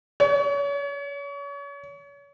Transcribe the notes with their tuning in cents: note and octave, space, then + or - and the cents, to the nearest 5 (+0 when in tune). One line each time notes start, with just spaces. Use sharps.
C#5 +35